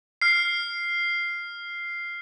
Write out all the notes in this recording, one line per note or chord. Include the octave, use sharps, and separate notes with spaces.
F6 C7